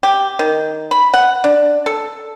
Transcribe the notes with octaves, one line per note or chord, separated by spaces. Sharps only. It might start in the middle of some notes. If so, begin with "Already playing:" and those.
G4
D#3
B5
F#5
D4
A4